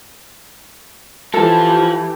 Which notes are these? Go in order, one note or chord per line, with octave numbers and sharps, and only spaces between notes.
E3 F3 F4 G4 A4